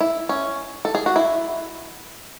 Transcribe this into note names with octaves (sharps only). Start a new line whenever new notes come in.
E4
C#4
A4
G#4
F#4
E4